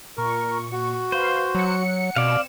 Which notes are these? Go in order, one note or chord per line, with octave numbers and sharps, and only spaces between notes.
A#2 A#4 C#6
F#4
B4 C5 F5 C6
F#3 F#5 C#7
B2 C4 D5 F5 E7